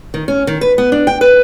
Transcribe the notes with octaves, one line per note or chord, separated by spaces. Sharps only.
D#3
C#4
D#3
B4
B3
D4
G5
B4